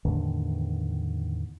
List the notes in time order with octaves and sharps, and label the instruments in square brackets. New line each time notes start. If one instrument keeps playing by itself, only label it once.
[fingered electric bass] E2 A2 D3 D#3